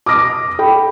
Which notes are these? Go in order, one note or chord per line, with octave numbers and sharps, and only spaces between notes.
D6 D#6 F6 A#6 D7
A4 G5 B5